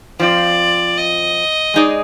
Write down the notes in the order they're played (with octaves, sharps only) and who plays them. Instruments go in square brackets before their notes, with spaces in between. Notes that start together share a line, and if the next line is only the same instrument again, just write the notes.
[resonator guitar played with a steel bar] F3 C4 F4 [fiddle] D5
[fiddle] D#5
[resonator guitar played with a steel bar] G#3 D#4 G#4 D5